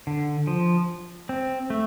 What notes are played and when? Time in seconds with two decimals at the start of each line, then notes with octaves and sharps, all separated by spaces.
0.07 D3
0.47 F3
1.29 C4
1.70 A3